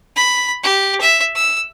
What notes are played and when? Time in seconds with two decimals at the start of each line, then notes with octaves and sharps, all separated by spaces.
0.16 B5
0.63 G4
1.01 E5
1.35 E6